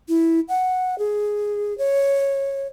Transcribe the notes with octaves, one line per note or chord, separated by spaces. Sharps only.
E4
F#5
G#4
C#5